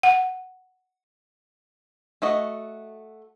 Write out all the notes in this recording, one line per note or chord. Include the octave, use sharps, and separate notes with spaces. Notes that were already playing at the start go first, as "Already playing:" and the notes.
F#5
A3 F#4 D#5